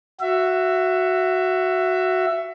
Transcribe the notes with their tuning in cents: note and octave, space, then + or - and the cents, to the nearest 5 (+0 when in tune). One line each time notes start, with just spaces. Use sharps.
F#4 +0 E5 +20